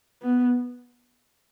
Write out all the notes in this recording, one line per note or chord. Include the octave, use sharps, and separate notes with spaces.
B3